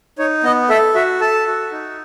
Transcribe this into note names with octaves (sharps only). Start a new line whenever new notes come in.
D#4 C#5
B3 D#5
A4 E5
F#4 E5
A4 A5
F#4
D#4